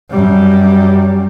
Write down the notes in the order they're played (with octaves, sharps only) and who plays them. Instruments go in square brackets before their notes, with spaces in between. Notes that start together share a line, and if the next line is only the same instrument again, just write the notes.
[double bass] F#2 G3